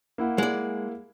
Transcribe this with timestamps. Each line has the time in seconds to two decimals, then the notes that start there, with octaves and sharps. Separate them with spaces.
0.18 A#3 E4 F#5
0.38 G#3 D5